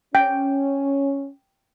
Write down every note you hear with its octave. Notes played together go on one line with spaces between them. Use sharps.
C#4 G5